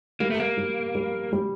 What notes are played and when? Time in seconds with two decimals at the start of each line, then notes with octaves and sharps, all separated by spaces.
0.20 G3 A#3
0.30 A3
0.40 A#3
0.58 G3
0.95 G3
1.33 G3